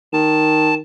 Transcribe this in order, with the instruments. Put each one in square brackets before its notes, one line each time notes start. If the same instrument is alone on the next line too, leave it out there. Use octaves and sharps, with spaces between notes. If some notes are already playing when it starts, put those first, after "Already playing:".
[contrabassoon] D#3 [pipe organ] A5